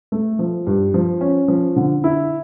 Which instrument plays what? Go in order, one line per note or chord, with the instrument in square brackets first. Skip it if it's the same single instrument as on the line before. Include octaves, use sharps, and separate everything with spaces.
[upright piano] A3
F3
G2
F3
C#4
F3
D3
E4